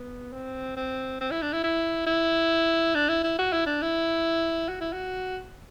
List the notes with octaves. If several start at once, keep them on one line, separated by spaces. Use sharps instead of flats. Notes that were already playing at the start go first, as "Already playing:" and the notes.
Already playing: B3
C4
C4
C4
E4
D4
E4
E4
E4
D4
E4
E4
F#4
E4
D4
E4
F#4
E4
F#4